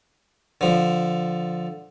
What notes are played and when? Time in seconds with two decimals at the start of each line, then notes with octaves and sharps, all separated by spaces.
0.61 D3 F3